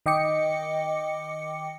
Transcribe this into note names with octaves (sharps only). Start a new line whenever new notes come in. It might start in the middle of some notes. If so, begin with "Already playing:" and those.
D#3 D#5 G5 D6 C#7